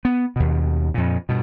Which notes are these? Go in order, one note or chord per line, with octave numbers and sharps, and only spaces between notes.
B3
D#2 B2
F2 A#2
G2 B2